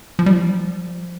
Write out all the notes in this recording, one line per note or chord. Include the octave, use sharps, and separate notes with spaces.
F3
G3
F3